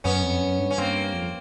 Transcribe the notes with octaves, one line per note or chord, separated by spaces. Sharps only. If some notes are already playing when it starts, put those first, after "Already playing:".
F#2 B3 C#4
F2
F#2
G2
C#4
G2 A#3 C4
F2